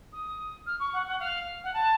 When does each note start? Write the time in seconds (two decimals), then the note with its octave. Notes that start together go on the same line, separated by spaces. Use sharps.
0.13 D#6
0.66 F6
0.80 C#6
0.93 F#5
1.07 F#5
1.20 F5
1.64 F#5
1.74 A5